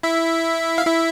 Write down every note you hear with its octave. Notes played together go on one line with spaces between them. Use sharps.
E4 E5
F5
E4 E5